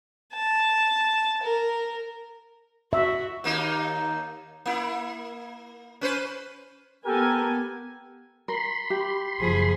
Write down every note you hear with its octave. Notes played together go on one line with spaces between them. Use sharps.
A5
A#4
F#4 E5
D#2 A#3 D#4
A#3 E4
C#4 B4 C5
B3 G4 A4 A#4 G#5
A#4 B5 C6
G4
F#1 F3 G#4